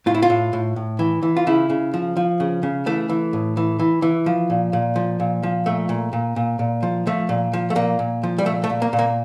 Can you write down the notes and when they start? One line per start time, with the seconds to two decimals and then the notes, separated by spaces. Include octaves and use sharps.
0.06 A2 F4
0.15 E4
0.22 F4
0.30 A2
0.53 A2
0.76 A2
0.99 E3
1.23 E3
1.37 F4
1.47 C#3 E4
1.70 C#3
1.94 F3
2.17 F3
2.40 C#3
2.63 C#3
2.86 E3 A3
3.09 E3
3.33 A2
3.57 E3
3.80 E3
4.02 E3
4.26 F3
4.50 A#2
4.73 A#2
4.96 F3
5.20 A#2
5.43 F3
5.66 A#2 A3
5.89 A#2
6.13 A#2
6.36 A#2
6.59 A#2
6.83 F3
7.07 F3 A3
7.29 A#2
7.53 F3
7.70 A3
7.75 A#2 A#3
7.99 A#2
8.23 F3
8.38 G3
8.46 A#2 A3
8.64 A3
8.70 A#2
8.82 A#3
8.93 A#2
8.99 A#3